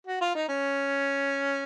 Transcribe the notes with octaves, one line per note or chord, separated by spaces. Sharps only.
F#4
F4
D#4
C#4